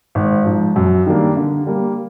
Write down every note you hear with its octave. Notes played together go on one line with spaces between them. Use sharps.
G#1
G#2 F3
F#2
D#3 G3 A#3 D4
D3
G3 A#3